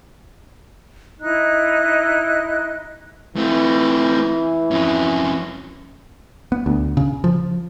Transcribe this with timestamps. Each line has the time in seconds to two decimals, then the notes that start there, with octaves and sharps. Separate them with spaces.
1.20 D#4 E4 D#5 F#6
3.36 E3 A3 C4
4.71 F2 C#4
6.52 B3
6.66 D2
6.97 C#3
7.24 F3